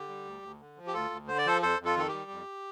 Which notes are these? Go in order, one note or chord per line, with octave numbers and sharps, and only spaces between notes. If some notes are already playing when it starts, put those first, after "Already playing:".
Already playing: D3 G4
G3
D2
D2
D3
F3
G4
D2 F4 A4
D2
D3 C5
D5
F3 A4 C5
F2 A4 C5
F2
F4 A4
D#3 A4
G4
G3
F2